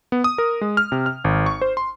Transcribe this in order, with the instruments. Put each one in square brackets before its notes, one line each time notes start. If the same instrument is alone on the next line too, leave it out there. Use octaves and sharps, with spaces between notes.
[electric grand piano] B3
D#6
A#4
G#3
F6
C3
F6
G#1
C#6
C5
C6